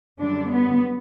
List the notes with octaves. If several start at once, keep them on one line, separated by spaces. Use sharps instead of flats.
F#2 D3 G3 D4
B3